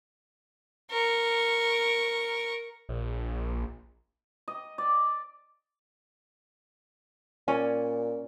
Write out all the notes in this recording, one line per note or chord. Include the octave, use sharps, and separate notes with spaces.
A#4 C#6
A#1
D#5
D5
A#2 C#4 D5 G#5